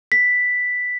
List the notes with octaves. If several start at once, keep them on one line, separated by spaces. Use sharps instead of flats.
B6